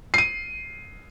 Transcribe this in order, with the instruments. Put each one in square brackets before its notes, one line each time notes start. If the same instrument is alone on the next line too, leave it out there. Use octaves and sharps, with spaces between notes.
[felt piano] C7 D#7